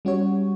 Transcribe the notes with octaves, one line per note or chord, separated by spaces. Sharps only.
G3 C#4 F#4 C#5